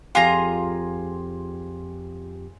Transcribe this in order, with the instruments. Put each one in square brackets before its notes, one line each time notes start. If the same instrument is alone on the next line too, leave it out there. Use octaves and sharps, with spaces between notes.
[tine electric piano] F2 G4 [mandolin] F4 G#4 A#5